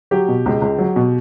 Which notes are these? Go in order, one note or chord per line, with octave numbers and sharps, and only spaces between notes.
F#3 G4
B2
C#2
C#2
F#3
B2